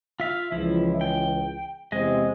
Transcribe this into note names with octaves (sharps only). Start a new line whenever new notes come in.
F4 E5 F5
C#2 E3 F3 E4
G5
E2 C3 G#3 C4 D#5